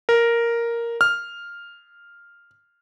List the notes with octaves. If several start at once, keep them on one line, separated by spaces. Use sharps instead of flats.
A#4
F6